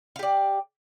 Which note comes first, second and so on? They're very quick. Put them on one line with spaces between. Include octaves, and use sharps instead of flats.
F5 G4 D5